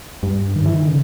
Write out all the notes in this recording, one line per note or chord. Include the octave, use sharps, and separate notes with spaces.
G2
D#3
E3
D#3
C#3